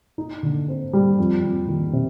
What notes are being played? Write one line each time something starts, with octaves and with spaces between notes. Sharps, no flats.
D#4
D3
C4
G3
F2
F2
D#3
C3